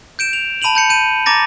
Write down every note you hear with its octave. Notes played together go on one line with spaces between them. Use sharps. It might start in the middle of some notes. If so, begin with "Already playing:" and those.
G6 D7 E7
F7
A5 B5 D#7 F7 F#7
A5 G6 C#7
G6 D#7
A#5 D6 A6 A#6